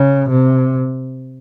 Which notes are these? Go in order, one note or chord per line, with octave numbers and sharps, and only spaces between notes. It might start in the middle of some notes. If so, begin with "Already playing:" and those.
Already playing: C#3
C3